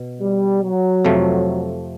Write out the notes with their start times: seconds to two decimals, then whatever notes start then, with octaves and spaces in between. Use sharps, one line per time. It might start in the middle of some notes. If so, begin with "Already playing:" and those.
Already playing: B2
0.21 G3
0.62 F#3
1.05 F2 C3 F3 A3